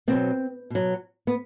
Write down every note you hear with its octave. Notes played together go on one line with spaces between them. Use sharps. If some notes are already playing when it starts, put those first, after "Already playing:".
B2 F#3 C4
B2 F#3
B3